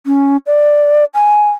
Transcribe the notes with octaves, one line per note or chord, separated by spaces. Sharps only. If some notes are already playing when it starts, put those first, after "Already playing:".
C#4
D5
G#5